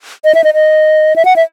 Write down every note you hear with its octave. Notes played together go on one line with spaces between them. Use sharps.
D#5
E5
D#5
D#5
E5
F#5
E5